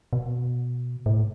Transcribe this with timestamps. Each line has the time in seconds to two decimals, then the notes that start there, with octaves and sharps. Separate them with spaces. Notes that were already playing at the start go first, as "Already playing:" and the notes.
0.13 B2
1.06 A2